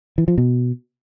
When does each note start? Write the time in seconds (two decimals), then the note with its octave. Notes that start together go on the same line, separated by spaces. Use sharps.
0.18 E3
0.28 F3
0.38 B2